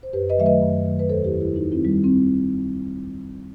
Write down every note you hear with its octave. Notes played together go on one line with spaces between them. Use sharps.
C5
F#2 G4 B4
B4 D#5
D#3 F#3 A3 E5
B4 D#5
F#2
D#3 F#3 A3
B4
E2 A4 C5
E4 G4
D#3 G3
E4 G4
E2 D#4 F#4
C4 E4
D#3
G3
C4